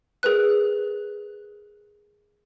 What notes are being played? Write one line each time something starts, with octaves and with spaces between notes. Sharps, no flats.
G#4 A#4 B4 F#6